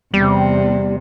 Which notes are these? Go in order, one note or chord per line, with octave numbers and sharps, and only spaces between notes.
E2 C3 G3